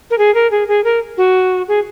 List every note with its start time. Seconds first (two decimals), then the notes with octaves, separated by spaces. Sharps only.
0.11 A#4
0.18 G#4
0.35 A#4
0.51 G#4
0.68 G#4
0.84 A#4
1.17 F#4
1.68 G#4